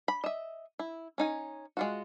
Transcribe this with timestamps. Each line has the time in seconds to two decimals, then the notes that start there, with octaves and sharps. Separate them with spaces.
0.08 B5
0.24 D#5 E5
0.79 E4
1.18 C#4 D#4 G#5
1.77 G#3 F4 F#4